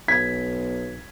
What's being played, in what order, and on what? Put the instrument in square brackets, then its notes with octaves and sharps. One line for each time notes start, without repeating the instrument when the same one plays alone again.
[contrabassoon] B1 [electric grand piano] G#6 B6